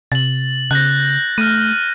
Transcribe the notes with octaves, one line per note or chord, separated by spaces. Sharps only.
C3 A6 F#7
C#3 F#6 G6 A#6
A3 F6 D#7